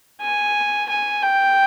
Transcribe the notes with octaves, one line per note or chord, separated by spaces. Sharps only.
G#5
G#5
G5